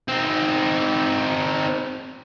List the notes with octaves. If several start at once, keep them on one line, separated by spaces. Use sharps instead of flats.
C4 D#4